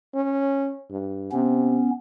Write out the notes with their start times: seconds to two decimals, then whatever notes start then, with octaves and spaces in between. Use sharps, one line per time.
0.14 C#4
0.90 G2
1.32 C3 B3 C#4